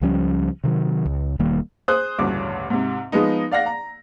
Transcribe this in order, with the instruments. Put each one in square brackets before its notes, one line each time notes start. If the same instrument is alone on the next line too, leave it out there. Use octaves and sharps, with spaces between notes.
[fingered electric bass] C#2 F3 G3 C#4
C3 D#3 F#3
C#2
E1 D#3 G3 A#3
[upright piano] G#4 C5 D#6 F#6
A1 D2 G2 C#3 C#4 D6
G#2 C3
F3 G#3 B3 D#4
D5 F5 F#5 A#6
A#5